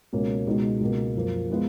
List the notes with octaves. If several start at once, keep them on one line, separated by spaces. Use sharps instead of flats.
C#2 B2 A#3 C#4
C#2 B2 G#3 D#4
C#2 B2 A#3
F#2 F3 A#3
F3 G#3 B3 F4